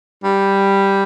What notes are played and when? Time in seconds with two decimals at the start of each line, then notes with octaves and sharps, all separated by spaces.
0.24 G3